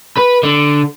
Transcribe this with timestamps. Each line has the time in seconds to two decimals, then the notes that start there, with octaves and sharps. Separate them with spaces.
0.18 B4
0.43 D3